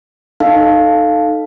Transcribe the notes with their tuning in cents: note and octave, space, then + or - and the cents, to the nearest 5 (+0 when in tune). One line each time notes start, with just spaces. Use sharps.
D#4 -15 A4 +0 F5 +0